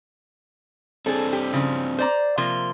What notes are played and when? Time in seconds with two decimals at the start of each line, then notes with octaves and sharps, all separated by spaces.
1.06 C4 D4 G#4 A4
1.33 G4
1.53 C#3 F3
1.98 C5 D5 A#5
2.38 C3 F3 A#3 C6